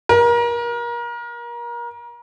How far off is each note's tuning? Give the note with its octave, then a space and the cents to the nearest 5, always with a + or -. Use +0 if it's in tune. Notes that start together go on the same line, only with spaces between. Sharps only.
A#4 +30